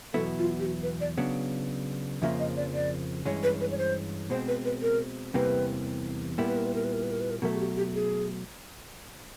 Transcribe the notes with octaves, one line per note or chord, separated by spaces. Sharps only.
E2 B2 F#3 B3 E4 A4
F4
G4
F#4
B4
D5
C#3 F#3 B3 D4
F2 C#3 F3 A#3 E5
D#5
D5
D5
G2 E3 G#3 C#4 C#5
B4
B4
C#5
C5
B2 G#3 C4 C5
B4
B4
A#4
E2 C3 E3 G3 A#3 B4
A#2 G3 B3 E4 A#4
B4
A#4
B4
A#4
B4
A#4
B4
A#4
B4
A#4
B2 F#3 A3 A#4
G#4
G4
G4
G#4